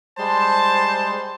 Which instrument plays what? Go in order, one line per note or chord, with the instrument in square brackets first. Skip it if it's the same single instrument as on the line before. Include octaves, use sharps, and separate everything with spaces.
[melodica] G3 G#3 C6 [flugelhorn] C5 [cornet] A5